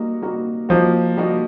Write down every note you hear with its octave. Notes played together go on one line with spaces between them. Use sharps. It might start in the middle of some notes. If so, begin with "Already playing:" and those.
Already playing: G3 A#3 D#4 F#4
G3 A#3 D#4 F#4
F3 G3 A#3 D#4 F#4
G3 A#3 D#4 F#4